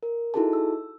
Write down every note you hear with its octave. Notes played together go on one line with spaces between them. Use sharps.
A#4
D#4 E4 F#4 G#4 A4 A5
E6